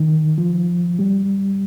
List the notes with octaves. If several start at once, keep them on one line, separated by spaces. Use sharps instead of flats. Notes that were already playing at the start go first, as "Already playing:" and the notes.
Already playing: D#3
F3
G3